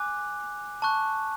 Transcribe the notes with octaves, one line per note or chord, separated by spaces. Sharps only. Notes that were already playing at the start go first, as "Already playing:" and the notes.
Already playing: G#5 D6 F#6
A5 C#6 F#6